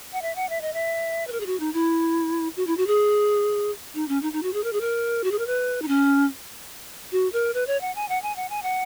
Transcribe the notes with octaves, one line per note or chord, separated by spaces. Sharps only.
F#5
E5
F#5
E5
D#5
E5
B4
A#4
G#4
F#4
D#4
E4
F#4
E4
F#4
G#4
D#4
C#4
D#4
D#4
F#4
G#4
A#4
G#4
A#4
F#4
G#4
A#4
B4
D#4
C#4
F#4
A#4
B4
C#5
F#5
G#5
F#5
G#5
F#5
G#5
F#5